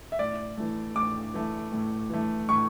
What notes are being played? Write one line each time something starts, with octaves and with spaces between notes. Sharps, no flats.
E5
A2 D5
E3 A3
A2 D6
E3 A3
A2
E3 A3
A2 C#6